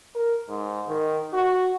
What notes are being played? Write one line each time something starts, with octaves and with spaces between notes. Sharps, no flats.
A#4
G#2
D#3
F#4